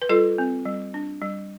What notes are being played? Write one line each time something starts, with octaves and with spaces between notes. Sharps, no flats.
B4
G3 F4 A4
C4
G3
D4
G3